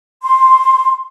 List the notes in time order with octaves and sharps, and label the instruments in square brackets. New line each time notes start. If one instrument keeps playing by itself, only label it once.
[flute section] C6